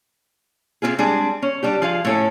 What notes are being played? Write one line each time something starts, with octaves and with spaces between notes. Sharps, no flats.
C3 F#3 C4 F4 G#4
G3 G#3 C4 D4 G#4
C#4
G3 D4 G4
F3 G#4 F5
A2 C#4 A4